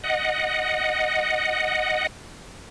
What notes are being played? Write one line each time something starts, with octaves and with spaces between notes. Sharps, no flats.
D#5 F#5